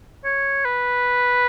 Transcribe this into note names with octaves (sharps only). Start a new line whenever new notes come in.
C#5
B4